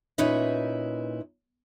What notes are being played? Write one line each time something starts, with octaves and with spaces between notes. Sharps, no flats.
A#2 C#4 D#4 E4 B4 E5